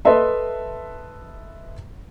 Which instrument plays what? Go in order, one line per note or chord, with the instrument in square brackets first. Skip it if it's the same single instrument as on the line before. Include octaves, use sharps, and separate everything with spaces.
[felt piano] A4 B4 D#5 E5 C6